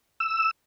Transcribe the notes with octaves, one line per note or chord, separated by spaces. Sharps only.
E6